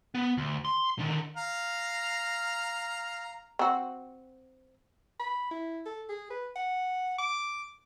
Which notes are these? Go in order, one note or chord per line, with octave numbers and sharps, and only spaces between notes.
B3
D2
C6
D3 D#3
F5 A#5
C4 F#4
B5
E4
A4
G#4
B4
F#5
D6